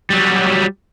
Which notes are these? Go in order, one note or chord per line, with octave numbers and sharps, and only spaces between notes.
F#3 G3